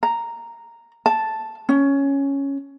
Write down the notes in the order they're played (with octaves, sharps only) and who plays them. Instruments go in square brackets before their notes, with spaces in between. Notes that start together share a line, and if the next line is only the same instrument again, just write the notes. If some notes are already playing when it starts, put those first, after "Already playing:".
[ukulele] A#5
A5
C#4